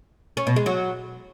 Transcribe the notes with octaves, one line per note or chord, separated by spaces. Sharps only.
C#4
B2
G#3
F#3